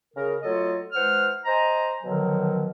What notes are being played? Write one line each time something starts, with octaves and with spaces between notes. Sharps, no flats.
C#3 A#4
F#3 A3 F4 A4 C#5 D#5
E3 G#3 C5 F#5 F6
C5 D#5 G#5 A#5
B2 D3 D#3 F3 F#3